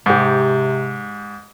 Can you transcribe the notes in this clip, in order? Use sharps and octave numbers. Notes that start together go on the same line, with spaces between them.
G#2 C3 G4